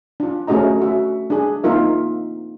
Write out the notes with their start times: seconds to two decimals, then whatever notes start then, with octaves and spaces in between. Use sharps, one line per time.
0.20 D4 F4
0.47 A3 C#4 F#4 G#4 D#5 A#5
0.82 F#4 E5
1.30 D4 G#4
1.64 A#3 C4 D#4 F4 A#4 E5